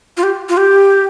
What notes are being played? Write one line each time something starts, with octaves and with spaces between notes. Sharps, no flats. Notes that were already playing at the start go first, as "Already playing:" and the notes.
F4
G4
F4
G4